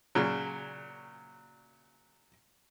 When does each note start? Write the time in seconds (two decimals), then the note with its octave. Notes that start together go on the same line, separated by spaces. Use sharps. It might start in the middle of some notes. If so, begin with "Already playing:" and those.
0.15 A#2 C#3 F#3